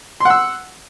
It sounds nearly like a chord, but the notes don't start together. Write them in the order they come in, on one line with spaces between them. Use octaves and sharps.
C6 F#5 E6